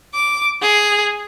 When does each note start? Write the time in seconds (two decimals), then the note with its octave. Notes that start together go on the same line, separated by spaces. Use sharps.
0.11 D6
0.60 G#4